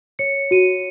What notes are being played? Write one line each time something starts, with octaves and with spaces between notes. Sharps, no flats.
C#5 C#7
F#4 D#7